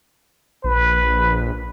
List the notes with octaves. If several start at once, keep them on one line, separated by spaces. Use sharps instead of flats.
A#1 B4